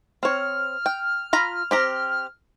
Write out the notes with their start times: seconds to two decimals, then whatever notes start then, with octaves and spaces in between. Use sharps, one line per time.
0.23 C4 C#5 F6
0.86 G5
1.33 F4 A#5 B5
1.71 C4 G4 A#5